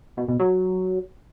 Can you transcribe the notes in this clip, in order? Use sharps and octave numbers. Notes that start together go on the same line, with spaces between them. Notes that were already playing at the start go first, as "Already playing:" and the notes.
B2
B2
F#3